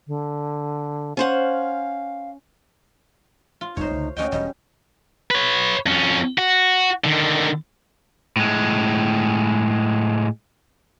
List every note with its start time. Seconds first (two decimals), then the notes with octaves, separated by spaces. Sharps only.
0.08 D3
1.17 C#4 C5 F5 F#5
3.61 F4
3.77 F1 C2 F2 D#4 C5 C#5
3.91 C#2 D3 A3
4.17 D2 A3 C#4 F#4 D#5 G5
4.32 E1 G3 D#5
5.31 B4 C#5
5.86 F2 C#4
6.38 F#4
7.04 D3 D#3
8.36 A2 G#3